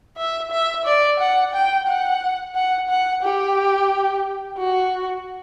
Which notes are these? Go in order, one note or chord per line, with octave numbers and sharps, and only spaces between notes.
E5
E5
D5
F#5
G5
F#5
F#5
F#5
G4
F#4